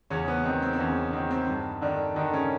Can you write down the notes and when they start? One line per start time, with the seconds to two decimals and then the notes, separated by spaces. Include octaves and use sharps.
0.10 E2 C#3 C#4
0.28 B3
0.45 D#3 C4
0.62 C4
0.73 C4
0.79 E2 C#3 C#4
1.13 D#3 C4
1.31 C4
1.48 G2
1.81 D3 D#3 D4
2.16 D3 D#3 D4
2.33 C#3 C#4